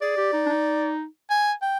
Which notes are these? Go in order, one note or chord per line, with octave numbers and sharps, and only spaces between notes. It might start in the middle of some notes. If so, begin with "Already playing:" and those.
G#4 D5
G4
D#4
D4
D#4
G#5
G5